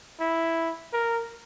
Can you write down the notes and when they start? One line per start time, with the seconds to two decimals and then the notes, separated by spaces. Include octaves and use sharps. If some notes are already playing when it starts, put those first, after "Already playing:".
0.20 E4
0.93 A#4